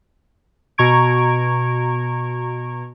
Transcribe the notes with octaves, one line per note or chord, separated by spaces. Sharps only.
B2 A#5 C#6 G#6 D7